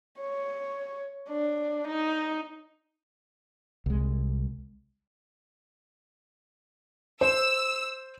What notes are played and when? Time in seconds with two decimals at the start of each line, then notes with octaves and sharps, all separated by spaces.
0.20 C#5
1.29 D4
1.87 D#4
3.86 C2 G#3
7.21 C5 E6